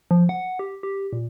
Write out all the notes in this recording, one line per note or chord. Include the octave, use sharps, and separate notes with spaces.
F3
F#5
G4
G4
A#2